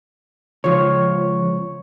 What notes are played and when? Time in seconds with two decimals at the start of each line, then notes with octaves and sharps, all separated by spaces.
0.64 C#2 F3 C#5 C#6